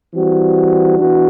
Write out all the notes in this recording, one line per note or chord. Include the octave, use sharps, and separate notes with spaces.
E3 G3 C4 F#4
E3 B3 D4 F#4